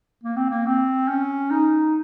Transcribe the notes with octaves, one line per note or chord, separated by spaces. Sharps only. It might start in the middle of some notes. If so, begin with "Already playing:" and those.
A#3
C4
A#3
C4
C#4
D#4